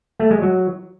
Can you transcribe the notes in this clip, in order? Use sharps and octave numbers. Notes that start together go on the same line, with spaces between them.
A3
G#3
F#3